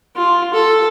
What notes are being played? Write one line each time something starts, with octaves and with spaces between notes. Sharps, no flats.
F4
A4